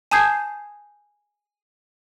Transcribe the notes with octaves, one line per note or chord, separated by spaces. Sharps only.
G#5 A5 D#6 G6 G#6 C7